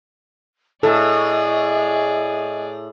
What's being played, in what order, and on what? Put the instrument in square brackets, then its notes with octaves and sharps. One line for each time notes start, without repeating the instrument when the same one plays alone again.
[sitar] A2 [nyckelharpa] G#4 D5 [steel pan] A4 [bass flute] D#5